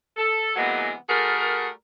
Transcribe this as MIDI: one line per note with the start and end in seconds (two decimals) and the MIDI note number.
0.17 0.56 69
0.56 0.93 48
0.56 0.93 52
0.56 0.93 54
0.56 0.93 56
0.56 0.93 58
0.56 0.93 59
1.08 1.68 55
1.08 1.68 57
1.08 1.68 66
1.08 1.68 68
1.08 1.68 70